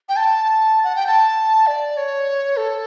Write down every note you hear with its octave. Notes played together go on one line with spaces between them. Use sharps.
G5
A5
F#5
G5
A5
D5
C#5
A4